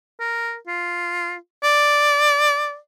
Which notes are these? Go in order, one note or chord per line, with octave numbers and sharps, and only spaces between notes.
A#4
F4
D5